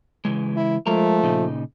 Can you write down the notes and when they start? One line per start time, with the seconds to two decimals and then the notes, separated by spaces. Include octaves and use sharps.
0.25 C#3 E3 G#3
0.56 E4
0.87 F3 G#3 A3 A#4 A#5
1.23 A#2 C#3 D#4